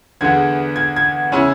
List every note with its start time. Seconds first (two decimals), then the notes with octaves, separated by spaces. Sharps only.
0.21 E2 D3 G#3 B3 G#6
0.76 G#6
0.96 G#6
1.32 C#3 G#3 C#4 E4